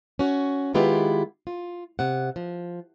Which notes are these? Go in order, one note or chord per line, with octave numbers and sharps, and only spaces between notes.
C#4 F#4
D#3 G#3 B3 E4 F4 G4
F4
C3 F#5
F3